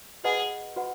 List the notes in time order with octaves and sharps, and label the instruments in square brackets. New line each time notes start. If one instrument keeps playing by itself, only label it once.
[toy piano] F#4 B4 D#5 F#5 B5 [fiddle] G#4
[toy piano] F#4 B4 D#5 F#5 B5